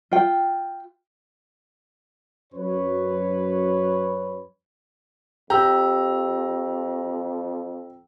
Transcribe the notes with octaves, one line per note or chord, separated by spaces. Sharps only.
F4 G5
F#2 B4 C#5
F2 G4 G5 A#5 E6